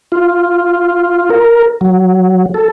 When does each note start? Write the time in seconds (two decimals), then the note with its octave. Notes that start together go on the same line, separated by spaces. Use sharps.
0.12 F4
1.30 A#4
1.81 F#3
2.54 A4